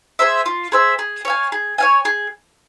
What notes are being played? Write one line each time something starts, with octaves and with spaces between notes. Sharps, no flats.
G#4 C5 E5
F4
G#4 C5 E5
G#4
C#5 F5 G#5
G#4
C#5 F5 G#5
G#4